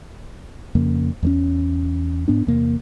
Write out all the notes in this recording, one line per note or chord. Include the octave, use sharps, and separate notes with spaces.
F2 C#3 A#3
E2 A3 C#4
G#2 B3 D4
E2 C3 A#3